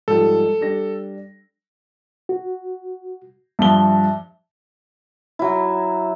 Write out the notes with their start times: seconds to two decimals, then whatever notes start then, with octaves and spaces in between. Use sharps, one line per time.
0.08 G#2 F3 G3 A4
0.61 G3 D4 A#6
2.29 F#4
3.59 G2 F3 E5 G7
5.39 F#3 E4